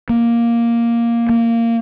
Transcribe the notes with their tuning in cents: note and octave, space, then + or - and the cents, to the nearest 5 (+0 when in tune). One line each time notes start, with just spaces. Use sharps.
A#3 +5
A#3 -15